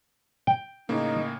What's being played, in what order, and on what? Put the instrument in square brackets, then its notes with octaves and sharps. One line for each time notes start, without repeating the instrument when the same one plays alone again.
[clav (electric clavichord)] G5
[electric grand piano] A2 C#3 A#3 [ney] D#4